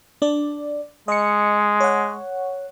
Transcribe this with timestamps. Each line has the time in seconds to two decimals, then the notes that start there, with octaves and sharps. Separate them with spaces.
0.22 D4 D5
1.08 G#3 D#5 C#7
1.80 C#5 F#5